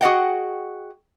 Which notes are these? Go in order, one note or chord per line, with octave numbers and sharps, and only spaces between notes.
F#4 G#4 A4 D#5 F#5 G5